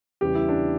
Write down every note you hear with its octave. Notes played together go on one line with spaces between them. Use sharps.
E2 C#3 E3 G3 G4
E4
D4